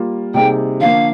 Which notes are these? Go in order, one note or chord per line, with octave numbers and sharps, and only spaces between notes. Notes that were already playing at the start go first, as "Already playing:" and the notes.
Already playing: G3 A#3 F4
C3 G3 A#3 D#4 G#4 G5
D3 F3 A#3 F5